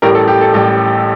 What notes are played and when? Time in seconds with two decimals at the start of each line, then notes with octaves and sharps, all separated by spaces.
0.02 A1 A2 G3 G4 A#4
0.15 A4
0.28 G4
0.41 A4
0.54 A1 A2 G3 G4